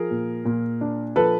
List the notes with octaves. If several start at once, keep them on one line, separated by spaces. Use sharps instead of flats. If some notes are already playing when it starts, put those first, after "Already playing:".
Already playing: F3 G#4 A#4
A#2
A#2
D4
F3 A4 B4